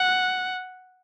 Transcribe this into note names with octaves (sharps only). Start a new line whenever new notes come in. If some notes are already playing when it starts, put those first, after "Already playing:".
Already playing: F#5